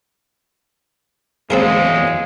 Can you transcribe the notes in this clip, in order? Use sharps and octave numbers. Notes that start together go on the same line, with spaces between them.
E2 F#3 G#3 C4 G#4 A#4 F5